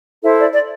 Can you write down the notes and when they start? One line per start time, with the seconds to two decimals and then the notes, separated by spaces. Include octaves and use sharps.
0.22 E4 A4 C5 E5
0.38 D5
0.54 D5